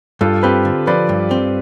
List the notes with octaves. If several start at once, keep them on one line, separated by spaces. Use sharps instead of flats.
G2 F4 A4
C4 G4 B4
D3
F3 B4 D5
G2
C4